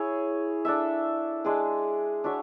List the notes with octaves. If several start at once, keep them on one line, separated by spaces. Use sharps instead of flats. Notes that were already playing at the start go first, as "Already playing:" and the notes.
Already playing: E4 G#4 C#5
D4 A4 E5
G#3 D4 G#4 D5
D4 F#4 C#5 E5